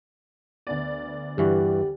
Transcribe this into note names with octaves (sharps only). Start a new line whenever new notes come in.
D2 B3 D5
G2 E3 F#4 G4